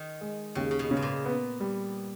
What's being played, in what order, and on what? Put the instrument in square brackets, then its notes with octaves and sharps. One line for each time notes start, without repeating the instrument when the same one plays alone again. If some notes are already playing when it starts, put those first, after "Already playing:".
Already playing: [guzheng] D#3
[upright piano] G#3
[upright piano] D#2 [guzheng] C#3
[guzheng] C#3
B2
[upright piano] C#3
[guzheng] G#2
A#2
[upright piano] B3
G3